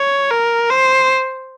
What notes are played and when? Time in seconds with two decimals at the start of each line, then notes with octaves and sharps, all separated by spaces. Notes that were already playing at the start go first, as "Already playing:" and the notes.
Already playing: C#5
0.31 A#4
0.70 C5